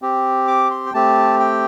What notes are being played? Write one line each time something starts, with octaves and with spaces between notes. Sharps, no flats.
C4 G4
D6
C6
G5
A3 C4 G4 A5
G5